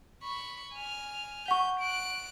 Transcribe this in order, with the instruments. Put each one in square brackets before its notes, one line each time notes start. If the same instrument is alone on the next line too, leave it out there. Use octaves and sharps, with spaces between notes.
[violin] B5 C#6
G#5 F6
[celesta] F#5 C#6 [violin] G6
[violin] F#6 D7